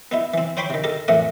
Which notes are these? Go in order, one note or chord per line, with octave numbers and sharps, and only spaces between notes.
B3 D#4 E4
E3 C4
C5 C#5 G5 B5 C6 D6
C3 D#3
D#4 G4 A4 A#4
F2 A2 E3 A3 A#4 F#5